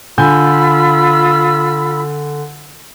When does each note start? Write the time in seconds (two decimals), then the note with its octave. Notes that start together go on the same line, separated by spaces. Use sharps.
0.18 D3 F4 G#5 B5 E6 G6